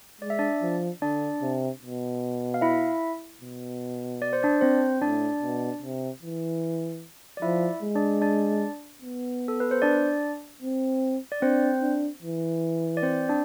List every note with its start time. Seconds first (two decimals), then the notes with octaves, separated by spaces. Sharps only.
0.21 G#3 D5
0.30 E5
0.39 D4 D5
0.62 F3
1.02 D3 D4 D5
1.42 C3
1.82 B2
2.54 F5
2.61 E4 E5
3.41 B2
4.22 D5
4.33 C5
4.43 D4 D5
4.61 C4 C5
5.01 A2 D4 D5
5.42 B2
5.82 C3
6.22 E3
7.37 D5
7.42 F3 E4 E5
7.83 G#3
7.95 D4 D5
8.22 D4 D5
9.02 B3
9.48 A4
9.60 B4
9.71 C5
9.82 D4 D5
10.62 C4
11.32 D5
11.42 C4 D4 C5
11.82 D4
12.22 E3
12.97 D5
13.02 C4 C5
13.29 D4 D5